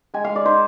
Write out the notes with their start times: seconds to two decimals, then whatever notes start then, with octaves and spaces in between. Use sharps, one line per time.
0.14 G#3 G#5
0.24 F5
0.30 G#3
0.35 D5
0.45 D#4 C5